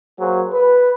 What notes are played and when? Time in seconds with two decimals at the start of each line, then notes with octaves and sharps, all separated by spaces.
0.20 F#3 A#3 G#4 C5
0.52 B4